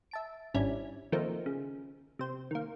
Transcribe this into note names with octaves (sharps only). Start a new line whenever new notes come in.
E5 A5 D7
G#1 G3 C#4 D4 E4 G#6
D#3 F3 A3 A#3 C4 D#4
C#3
C3 C5
D#3 A#3